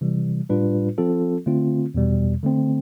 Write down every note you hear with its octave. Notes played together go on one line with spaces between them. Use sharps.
C3 E3 G3
A2 G3 D4 F4 B4
F3 C4 F4 A4
D3 A3 C4 F4
E2 B2 G3
D3 A3 C4